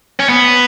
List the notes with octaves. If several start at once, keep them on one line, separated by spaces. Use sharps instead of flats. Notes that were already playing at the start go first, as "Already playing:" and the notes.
C#4
B3